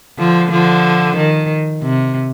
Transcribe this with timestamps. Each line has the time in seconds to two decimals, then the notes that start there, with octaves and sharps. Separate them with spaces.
0.18 D3 F3
0.51 D3 F3
1.17 D#3
1.82 C3